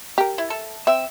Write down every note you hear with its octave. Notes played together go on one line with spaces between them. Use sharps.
G4 A#4
E4
A4
C4 E5